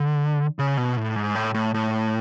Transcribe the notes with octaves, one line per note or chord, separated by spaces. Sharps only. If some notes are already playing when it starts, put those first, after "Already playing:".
Already playing: D3
C#3
B2
A2
G#2
A2
A2
A2